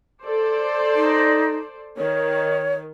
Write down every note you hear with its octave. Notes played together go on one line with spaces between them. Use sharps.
A4 C5 D5
D#4
D#3 C#5